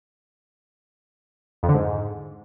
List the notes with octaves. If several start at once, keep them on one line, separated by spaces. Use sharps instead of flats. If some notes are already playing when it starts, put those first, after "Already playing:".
F2
D3
G#2